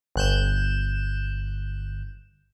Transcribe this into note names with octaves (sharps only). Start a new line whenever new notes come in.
G1 F#6 G6 E7